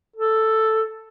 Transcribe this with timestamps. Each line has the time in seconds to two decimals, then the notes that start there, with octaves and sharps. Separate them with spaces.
0.16 A4